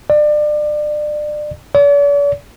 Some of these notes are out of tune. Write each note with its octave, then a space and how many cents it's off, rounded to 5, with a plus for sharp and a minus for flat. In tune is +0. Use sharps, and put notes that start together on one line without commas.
D5 +30
D5 -45